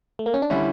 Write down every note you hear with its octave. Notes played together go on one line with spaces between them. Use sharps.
A3
A#3
C#4
D4
D3 G3 C#4 E4